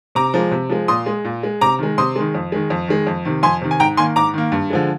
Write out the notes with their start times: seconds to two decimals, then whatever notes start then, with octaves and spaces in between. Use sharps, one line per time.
0.15 C3 A#5 D6
0.34 F3 G#3
0.51 C3
0.70 F3 G#3
0.88 A#2 C6 D#6
1.06 G#3
1.25 A#2
1.43 G#3
1.61 C3 A#5 D6
1.79 D#3 G#3
1.98 C3 C6 D#6
2.16 D#3 G#3
2.35 F2
2.52 D#3 G#3
2.70 F2
2.88 D#3 G#3
3.07 F2
3.25 C3 D#3
3.43 F2 G#5 C6
3.61 C3 D#3
3.71 G#5
3.80 G#2 G5 A#5
3.97 D#3 A#3 G#5 C6
4.16 G#2 A#5 D6
4.34 D#3 A#3
4.52 G2
4.70 D3 F3 G#3